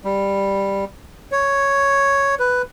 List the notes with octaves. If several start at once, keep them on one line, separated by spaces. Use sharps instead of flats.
G3
C#5
B4